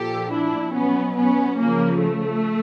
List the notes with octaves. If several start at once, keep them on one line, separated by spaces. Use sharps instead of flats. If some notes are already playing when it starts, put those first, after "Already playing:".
Already playing: A#2 F3 G4 A4
D4 E4
B2 F#3 B3 C#4
B3 C#4
C#3 F3 A#3
A3